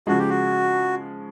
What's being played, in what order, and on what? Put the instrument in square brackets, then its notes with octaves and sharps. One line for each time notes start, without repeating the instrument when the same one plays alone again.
[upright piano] C#3 F3 G#3 [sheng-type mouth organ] F#4
[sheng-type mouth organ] G4
F#4